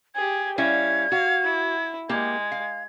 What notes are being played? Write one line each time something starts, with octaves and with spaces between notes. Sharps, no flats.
G4 G#4 G#6
G3 C#4 E4 F5 G#6
F#4 F5
E4
G#3 A#3 G4 G#6
F5